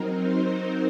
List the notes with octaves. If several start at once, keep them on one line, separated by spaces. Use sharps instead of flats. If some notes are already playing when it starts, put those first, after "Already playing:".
Already playing: F#3 C4 D#4 A#4
C5